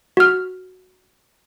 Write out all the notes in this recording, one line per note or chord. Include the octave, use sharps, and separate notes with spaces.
F#4 F6